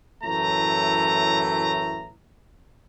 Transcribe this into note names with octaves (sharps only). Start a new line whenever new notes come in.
F#2 A2 E3 A3 A#5